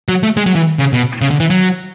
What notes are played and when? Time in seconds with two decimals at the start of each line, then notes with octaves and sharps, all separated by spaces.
0.09 F#3
0.23 A3
0.37 G#3
0.46 F#3
0.56 E3
0.79 C#3
0.93 B2
1.22 C#3
1.31 D3
1.40 E3
1.50 F#3